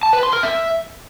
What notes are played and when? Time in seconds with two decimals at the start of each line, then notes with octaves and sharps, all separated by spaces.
0.03 A5
0.13 B4
0.23 C6
0.33 A#4
0.43 E5